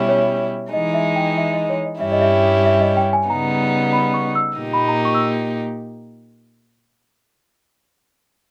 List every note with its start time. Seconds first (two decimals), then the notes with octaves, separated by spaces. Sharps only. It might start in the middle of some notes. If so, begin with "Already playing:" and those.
Already playing: B2 G3 C#4 E4 G4
0.09 C#5
0.73 E3 G#3 D#4 D#5
0.94 E5
1.16 G5
1.37 E5
1.53 D#5
1.69 C#5
1.85 D#5
2.01 G2 G3 C#4 E4 G4 E5
2.12 D#5
2.22 E5
2.66 E5
2.81 D#5
2.97 G5
3.13 G#5
3.29 C#3 G3 B3 D#4 A#5
3.93 B5
4.14 C#6
4.35 E6
4.57 A#2 A#3 D#4 G4
4.73 B5
4.89 A#5
5.05 C#6
5.14 E6